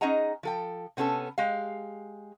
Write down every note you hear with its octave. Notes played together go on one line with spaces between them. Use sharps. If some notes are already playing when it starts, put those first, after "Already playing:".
C#4 D#4 G#4 D#5 F#5 A#5
F3 A4 G5
C3 B3 C#4 G#4 A4
G#3 G4 F5